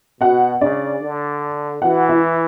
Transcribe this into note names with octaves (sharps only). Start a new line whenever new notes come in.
B2 F#4 F#5
C#3 D4 D5
D3
E3 F#4 F#5
E4 E5